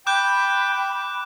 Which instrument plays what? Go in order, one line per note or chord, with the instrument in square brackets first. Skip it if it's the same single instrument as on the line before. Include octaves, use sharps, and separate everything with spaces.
[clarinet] G5 [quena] B5 [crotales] D6 F#6 G6